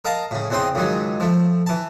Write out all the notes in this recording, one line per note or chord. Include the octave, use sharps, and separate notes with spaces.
A#4 D#5 F5 A5 A#5
A2 C#3
E2 C#3 C4 D#5 G5 C6
C#2 G#2 D#3 F#3
F3 A3
E3 A5